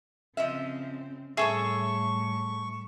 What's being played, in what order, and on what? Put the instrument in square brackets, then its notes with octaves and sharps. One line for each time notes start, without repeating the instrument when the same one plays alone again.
[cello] C#3 C4 [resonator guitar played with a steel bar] F3 D#5 E5
[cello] A2 G3 [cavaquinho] G#4 A4 C#5 [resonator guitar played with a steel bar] E5 [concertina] C#6